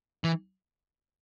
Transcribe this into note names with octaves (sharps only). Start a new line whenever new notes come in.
E3